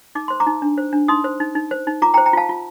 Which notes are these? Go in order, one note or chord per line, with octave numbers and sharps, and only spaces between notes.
D#4 D6
C5 C6
A#5 D6
D#4
D4
C5
D4
D#4 C6 D#6
C5
D#4
D#4
C5
D#4
F4 A#5 D6
G5 A#5
C5
G5 A#5
F4 F5 A5
F4